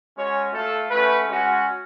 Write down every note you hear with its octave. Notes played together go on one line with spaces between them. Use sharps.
G#3 C#4 F#4 C#5
A3 F4 A4
A3 C#4 F#4 B4
G#3 C#4 F#4